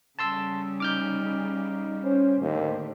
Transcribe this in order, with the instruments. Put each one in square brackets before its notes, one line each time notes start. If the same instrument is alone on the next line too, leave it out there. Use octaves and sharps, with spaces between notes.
[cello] C#3 G3 [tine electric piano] A5 C6 E6
[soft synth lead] D#4 [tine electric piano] D6 F6 G6
[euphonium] C#4 [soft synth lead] C5
[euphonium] D#2 [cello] A2 D3